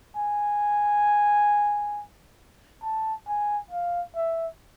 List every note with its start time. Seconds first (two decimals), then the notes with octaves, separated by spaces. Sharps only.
0.16 G#5
2.83 A5
3.28 G#5
3.71 F5
4.16 E5